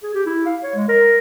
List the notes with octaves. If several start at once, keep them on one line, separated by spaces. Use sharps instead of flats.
G#4
G4
E4
F5
C#5
G#3
A#4